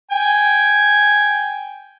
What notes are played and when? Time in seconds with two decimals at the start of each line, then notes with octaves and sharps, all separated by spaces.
0.11 G5 G#5